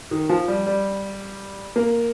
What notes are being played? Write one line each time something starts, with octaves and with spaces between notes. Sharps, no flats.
D#3
F3
G3
G3
A#3